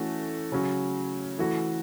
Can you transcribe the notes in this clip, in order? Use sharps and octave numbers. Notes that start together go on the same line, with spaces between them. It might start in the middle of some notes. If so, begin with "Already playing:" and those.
Already playing: E3 A3 C#4 F#4
C#3 F#3 C#4
E3 A3 F#4